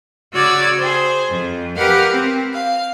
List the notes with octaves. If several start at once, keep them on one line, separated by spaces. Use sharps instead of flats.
C#3 F#4 D5 E6 F6 G#6
G#4 C5
F2
G4 A#4 B4 F5 F#5 F6
C4
F5